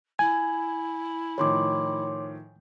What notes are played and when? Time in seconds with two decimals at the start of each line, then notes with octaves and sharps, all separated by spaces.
0.19 E4 G#5
1.38 A2 D#3 F3 C#5 C6 D6